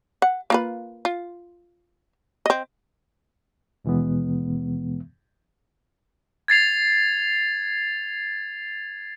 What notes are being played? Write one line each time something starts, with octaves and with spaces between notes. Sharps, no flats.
F#5
A#3 F4 B4
F4
C4 D#5
D#2 B2 E3 G#3 B3
G#6 A6 C7 F7